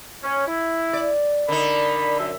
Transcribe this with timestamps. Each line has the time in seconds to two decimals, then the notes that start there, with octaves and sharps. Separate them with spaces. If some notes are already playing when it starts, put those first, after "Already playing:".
0.23 C#4
0.47 E4
0.93 D5
1.48 D3 D#4 A#4 D5 B5
2.19 F#2 E5